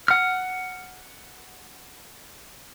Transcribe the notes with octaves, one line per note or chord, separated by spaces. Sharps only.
F#5 F6